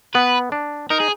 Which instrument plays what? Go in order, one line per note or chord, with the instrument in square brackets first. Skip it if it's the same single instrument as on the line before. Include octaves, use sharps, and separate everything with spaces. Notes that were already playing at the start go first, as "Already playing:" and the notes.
[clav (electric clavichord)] B3 [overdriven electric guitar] B4
[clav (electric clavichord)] D4
[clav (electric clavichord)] D#4 [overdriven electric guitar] A#4
[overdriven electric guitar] G#4